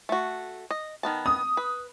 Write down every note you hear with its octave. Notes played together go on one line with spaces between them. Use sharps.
A3 F#4
D#5
D#3 B3 A5
D#6
B4